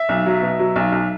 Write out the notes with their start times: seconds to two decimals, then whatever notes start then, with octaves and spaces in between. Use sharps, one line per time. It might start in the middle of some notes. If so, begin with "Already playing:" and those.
Already playing: E5
0.09 B1
0.26 F#3
0.42 B2
0.59 F#3
0.76 B1
0.92 B1